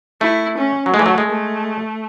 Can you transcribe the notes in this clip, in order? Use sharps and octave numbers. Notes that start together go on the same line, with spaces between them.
A3 E4
C#4
F#3
G#3 A3
E3
F#3
G#3
A3